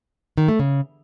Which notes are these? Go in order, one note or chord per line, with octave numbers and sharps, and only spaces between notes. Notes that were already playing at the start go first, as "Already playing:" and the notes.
D#3
A3
C#3